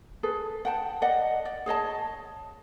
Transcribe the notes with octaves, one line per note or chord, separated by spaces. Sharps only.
G#4 A4 B4
F#5 G5 A5
D5 D#5 F#5
D5
G#4 C#5 D#5 A5